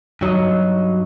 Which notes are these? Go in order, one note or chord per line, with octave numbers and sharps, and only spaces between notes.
G2 F#3 D#4 D#5